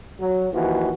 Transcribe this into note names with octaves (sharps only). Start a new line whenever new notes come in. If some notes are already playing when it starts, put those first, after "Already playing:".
F#3
D#2 E3 F3 F#4